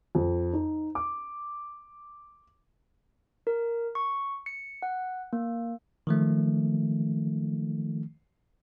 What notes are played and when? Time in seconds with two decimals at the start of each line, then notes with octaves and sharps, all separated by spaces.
0.15 F2
0.53 D#4
0.95 D6
3.47 A#4
3.95 C#6
4.46 C#7
4.82 F#5
5.33 A#3
6.07 D#3 F3 A3